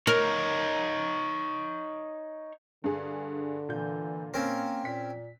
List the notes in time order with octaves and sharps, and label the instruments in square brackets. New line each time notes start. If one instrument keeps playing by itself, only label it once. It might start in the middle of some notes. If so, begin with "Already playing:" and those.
[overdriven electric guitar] D#4 C#5 [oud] A#4
[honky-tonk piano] G2 G#4 [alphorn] D3
[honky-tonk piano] A#2 G6 [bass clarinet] E3
[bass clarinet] A#3 [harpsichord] C4 C#4 A#4
[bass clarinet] A#2 [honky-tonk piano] B6